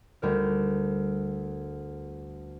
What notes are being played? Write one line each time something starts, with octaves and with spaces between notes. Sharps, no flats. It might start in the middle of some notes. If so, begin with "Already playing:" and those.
D2 G3 A#4